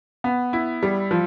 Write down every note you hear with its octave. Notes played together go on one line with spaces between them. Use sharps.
B3
E4
G3
F3